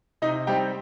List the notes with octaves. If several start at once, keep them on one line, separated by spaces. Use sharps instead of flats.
C3 D#4 D#5
G3 C4 D#4 G4 G5